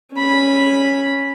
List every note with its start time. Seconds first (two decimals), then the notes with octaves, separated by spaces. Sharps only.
0.13 C#4 B5